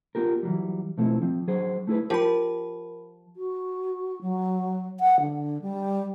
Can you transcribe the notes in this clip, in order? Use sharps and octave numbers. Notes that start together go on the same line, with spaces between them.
B3 F4 G4 A#4
E3 F#3 G3
B2 F3 A3 C4 E4
F3 C4
F#3 G#4 C5
A3 E4 G#4 B4
F3 G4 A#4 B5
F#4
F#3
F#5
D3
G3